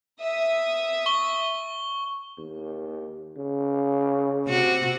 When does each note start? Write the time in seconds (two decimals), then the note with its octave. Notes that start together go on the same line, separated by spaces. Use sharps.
0.20 E5 D#6
1.06 C#6 G7
2.38 D#2
3.37 C#3
4.47 C3 F#4